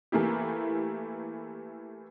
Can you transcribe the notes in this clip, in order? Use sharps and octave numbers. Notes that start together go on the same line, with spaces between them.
E3 A3 A#3 E4 G4